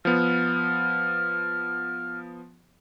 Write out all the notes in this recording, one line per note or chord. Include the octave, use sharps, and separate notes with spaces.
F3 B3 F6